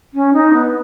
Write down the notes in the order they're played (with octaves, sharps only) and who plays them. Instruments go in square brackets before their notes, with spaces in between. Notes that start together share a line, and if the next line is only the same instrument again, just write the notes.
[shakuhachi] C#4
D#4
B3